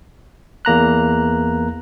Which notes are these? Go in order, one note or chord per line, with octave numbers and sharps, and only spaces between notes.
E2 A#3 A#5 F#6